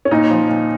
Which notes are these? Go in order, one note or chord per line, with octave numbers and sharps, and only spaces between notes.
C#4
A#2 D#4
F3
A#2